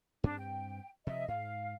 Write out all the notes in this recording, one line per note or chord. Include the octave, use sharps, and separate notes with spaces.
G2 C4 D4
G5
C3 F3 D#5 E5
G#2 F5